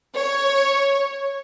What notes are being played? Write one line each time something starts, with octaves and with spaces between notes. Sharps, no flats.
C#5